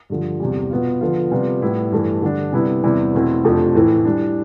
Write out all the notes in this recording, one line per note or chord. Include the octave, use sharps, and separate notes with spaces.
G2 D3 F3
E2 C3 G3
B2 B3 F4
D3 F3 B3 F4
C3 G3 B3 F4
A2 G3 B3 E4
G2 E3 A3
D3 G3 D4
C3 G3 B3 E4
E2 C3 G3 B3 E4
E2 B2 A3 C4 E4
F2 C3 F3 A3 D4
A2 E3 A3 E4
E3 G3 D4